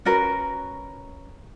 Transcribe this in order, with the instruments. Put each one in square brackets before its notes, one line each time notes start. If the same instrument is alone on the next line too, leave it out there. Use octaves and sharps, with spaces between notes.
[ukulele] C#4 F#4 A#4 B4